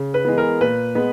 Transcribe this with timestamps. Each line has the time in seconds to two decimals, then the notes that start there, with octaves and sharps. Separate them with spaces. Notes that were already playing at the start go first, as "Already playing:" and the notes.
Already playing: C#3
0.14 B4
0.25 E3 G#3 B3
0.38 A#4
0.61 A#2 B4
0.95 G#3 B3